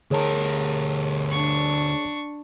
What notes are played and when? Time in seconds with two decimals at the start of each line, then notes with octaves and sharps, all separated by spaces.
0.11 D2 G#4 A#4 C#5 A5
1.30 D4 C#6